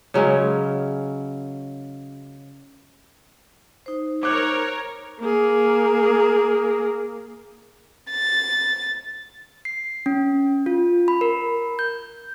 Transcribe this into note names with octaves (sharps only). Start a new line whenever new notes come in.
C#3 F#3 G#3 C#4
D#4 C5
A#4 C#5 D6 F#6 G6
A#3 G#4
A6
C7
C#4
F4
B5
A#4
G6